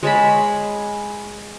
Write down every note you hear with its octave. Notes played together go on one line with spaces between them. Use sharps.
G#3 C#5 A5 B5